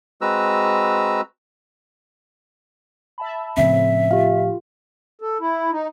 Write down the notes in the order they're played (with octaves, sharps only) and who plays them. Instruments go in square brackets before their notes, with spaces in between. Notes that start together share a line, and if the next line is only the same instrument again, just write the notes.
[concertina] G#3 C4 F#4 B4 A#5 E6
[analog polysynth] E5 A5 B5
[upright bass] A2 F3 [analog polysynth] C#3 C4 [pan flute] E5
[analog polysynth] F4 [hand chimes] G4 F5
[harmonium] A4
E4
D#4